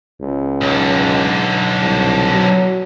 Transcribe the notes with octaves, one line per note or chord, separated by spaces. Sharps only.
C#2
B1 D3
C2
F#3